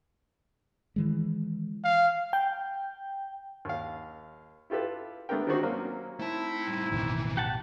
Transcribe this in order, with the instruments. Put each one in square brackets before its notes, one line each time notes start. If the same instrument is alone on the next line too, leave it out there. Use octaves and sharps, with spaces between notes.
[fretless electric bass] D#3 E3 G#3
[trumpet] F5
[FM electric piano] G5
[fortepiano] D#2 F5
E4 F4 G4 A4 B4
A3 B3 D4 G4 A#4 G5
D#3 C4 D4 D#4 F#4 C5
F#3 A#3 C4 C#4
[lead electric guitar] A3 A5 [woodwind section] C4 D#4 E4
[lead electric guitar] A2 G3
[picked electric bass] A1 F2 B2 [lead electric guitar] D#3 E3
[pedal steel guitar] G4 F#5 A5